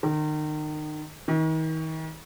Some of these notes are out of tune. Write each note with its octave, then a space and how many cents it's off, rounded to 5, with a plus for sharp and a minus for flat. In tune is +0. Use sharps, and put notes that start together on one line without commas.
D#3 -30
D#3 +40